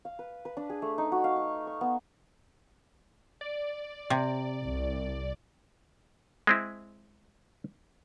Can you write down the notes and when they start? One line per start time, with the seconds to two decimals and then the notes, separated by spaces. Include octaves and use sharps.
0.05 F5
0.19 B4
0.45 B4
0.57 D4
0.70 G#4
0.82 A3
0.98 D#4
1.12 F#4
1.24 F5
1.36 C#6
1.67 C#6
1.81 B3
3.41 D5
4.10 C3
4.61 C2
6.47 G#3 C4 E4